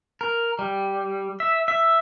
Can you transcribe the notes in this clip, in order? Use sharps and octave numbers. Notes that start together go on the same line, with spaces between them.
A#4
G3
E5
E5